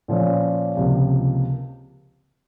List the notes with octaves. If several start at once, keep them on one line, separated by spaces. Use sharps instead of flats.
A#2 F3 A#3 C#4
C#2 C3 F3 A#3